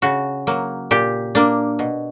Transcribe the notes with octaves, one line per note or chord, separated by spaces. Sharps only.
C#3 F#4
F#3 A#3
A#2 G4
A#3 D4
B2